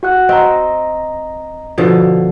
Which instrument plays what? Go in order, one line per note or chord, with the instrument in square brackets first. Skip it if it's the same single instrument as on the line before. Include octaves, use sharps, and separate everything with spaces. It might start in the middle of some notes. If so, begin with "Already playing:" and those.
[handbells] F#4 F#5 F#6
[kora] C4 [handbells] D#5 A#5
[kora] B2 D3 F3